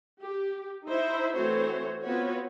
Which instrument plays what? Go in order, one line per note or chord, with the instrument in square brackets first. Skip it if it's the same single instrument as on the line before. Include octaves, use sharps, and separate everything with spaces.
[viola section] G4
D#4 E4 C5 E5
E3 A3 C4 F#4 C5 C#5
B3 C4 F4 F#4 B4 C#5